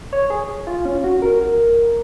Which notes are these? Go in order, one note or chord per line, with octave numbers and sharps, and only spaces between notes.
C#5
G#4
F4
C#4
F#4
A#4